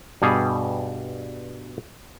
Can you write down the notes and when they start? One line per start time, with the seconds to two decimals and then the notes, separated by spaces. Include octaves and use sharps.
0.22 G2 B2 G3 G#4